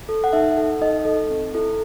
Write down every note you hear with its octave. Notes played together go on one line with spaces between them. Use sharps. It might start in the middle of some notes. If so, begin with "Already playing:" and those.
A4
F#5
D#4 E5
A4
D#4 D#5
A4
C4
E4 A4